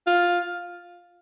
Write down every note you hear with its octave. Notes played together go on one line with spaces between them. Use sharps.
F4